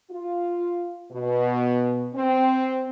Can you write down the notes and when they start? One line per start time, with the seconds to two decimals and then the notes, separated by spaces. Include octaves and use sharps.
0.11 F4
1.12 B2
2.15 C4